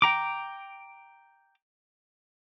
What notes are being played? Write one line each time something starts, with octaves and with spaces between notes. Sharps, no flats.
G5 A#5 D6